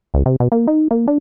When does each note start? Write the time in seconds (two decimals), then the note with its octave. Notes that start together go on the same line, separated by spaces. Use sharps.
0.14 C#2
0.26 C3
0.40 B2
0.52 A#3
0.68 D#4
0.91 A#3
1.08 D4